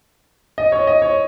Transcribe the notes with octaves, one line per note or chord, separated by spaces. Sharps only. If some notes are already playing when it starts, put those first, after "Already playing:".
D#5
C#5
D#5
C#5